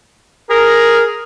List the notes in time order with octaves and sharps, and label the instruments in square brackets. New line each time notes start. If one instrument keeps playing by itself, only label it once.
[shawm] G#4 [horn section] A#4